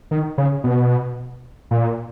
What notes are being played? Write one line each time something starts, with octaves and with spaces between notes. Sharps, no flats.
D#3
C#3
B2
A#2